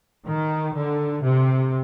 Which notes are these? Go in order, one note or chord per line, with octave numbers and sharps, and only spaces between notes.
D#3
D3
C3